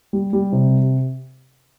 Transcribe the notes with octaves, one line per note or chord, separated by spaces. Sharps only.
G3
G3
C3